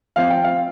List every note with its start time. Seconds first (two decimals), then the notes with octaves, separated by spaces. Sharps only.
0.16 F3 C4 F4 F5
0.30 G5
0.44 F5